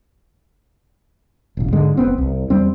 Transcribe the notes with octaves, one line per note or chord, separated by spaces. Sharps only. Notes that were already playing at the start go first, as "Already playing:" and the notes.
E1 A1
G#2 D3 G#3
F1 B3 C4
C2
E2 G3 C4